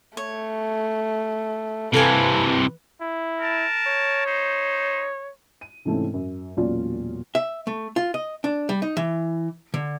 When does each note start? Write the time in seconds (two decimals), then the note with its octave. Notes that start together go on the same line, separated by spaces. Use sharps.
0.17 A3 C#5
1.94 C3 E3 A4 B4 F5 G#5
3.01 E4
3.40 A#4 A5
3.88 C#5
4.26 D#4 C5
5.61 D#7
5.85 G#2 C3 E3 A3 C4 C#4
6.14 F#2
6.57 E1 A#2 F#3 C#4 F4 D5
7.35 E5
7.67 A3
7.96 F4
8.14 D#5
8.44 D4
8.69 G3
8.82 D#4
8.97 E3
9.74 D3